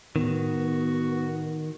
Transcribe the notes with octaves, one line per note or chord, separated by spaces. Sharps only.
A2 D#3 B3 F#4